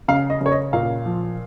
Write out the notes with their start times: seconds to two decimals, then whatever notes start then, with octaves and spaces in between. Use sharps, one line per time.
0.08 C#3 F5
0.30 D#5
0.41 C#3 C#5
0.52 D#5
0.73 A#2 F5
1.05 F3